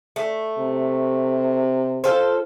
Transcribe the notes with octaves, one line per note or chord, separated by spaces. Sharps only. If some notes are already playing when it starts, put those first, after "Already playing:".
A3
C3
F4 A4 C5